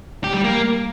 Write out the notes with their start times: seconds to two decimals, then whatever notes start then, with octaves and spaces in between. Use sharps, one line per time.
0.24 G4
0.34 G3
0.44 A#3